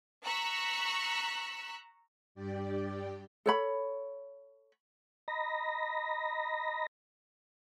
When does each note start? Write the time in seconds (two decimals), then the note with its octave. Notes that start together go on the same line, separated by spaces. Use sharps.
0.24 A#5 C#6 E6 F#6 B6
2.35 G2 G4 D5
3.46 A4 C#5 B5
5.28 D#5 A#5 B5 A#6